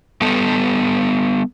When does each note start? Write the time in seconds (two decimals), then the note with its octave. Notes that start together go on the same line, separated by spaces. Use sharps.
0.21 G3 B3 A4